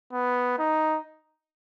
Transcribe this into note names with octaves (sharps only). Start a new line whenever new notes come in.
B3
D#4